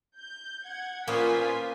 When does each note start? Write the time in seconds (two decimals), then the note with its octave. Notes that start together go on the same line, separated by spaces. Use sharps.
0.16 G6
0.65 F#5 G#6
1.07 A#2 A#3 B3 C#4 F4 C5 G#5 B6